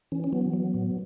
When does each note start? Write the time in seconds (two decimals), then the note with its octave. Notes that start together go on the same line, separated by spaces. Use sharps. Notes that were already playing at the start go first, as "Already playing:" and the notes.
0.12 E3 C#4
0.24 C#4
0.32 F#3 B3
0.53 F#3
0.74 A2